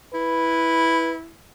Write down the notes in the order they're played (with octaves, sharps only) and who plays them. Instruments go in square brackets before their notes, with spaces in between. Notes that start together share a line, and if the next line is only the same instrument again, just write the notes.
[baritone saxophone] E4 [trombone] B4